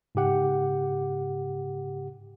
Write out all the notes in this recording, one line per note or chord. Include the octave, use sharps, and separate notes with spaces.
G#2 C#3 G4 F#5